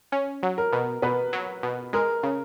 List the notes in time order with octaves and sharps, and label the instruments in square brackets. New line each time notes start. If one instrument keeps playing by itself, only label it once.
[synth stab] C#4
F#3
[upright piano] A#4
[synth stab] B2
[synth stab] B2 [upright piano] B4
[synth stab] F#3
B2
[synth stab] G#3 [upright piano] A#4
[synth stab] C#3